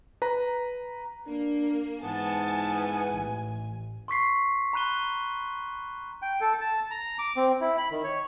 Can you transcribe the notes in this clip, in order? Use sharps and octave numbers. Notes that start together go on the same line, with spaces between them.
B4 A#5
A#3 D4
G#2 E3 B3 G#5 A5
A1
C6 C#6 B6 C7
A#5 B5 F#6 D#7 G7
G5
A4
A5
A#5
D6
C4
E4
B5
D#3
C#5